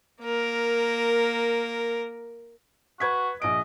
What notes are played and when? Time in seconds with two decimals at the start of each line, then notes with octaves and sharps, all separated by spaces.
0.21 A#3 A#4
3.00 F#4 B4 G#6 B6
3.42 A#1 D#5 D7